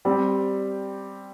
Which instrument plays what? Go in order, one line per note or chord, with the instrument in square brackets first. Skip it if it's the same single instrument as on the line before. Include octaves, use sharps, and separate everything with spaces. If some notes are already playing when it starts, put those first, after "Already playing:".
[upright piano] G3 C4 G4